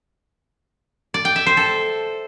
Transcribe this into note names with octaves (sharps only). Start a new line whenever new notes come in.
D5
G5
E5
C5
A4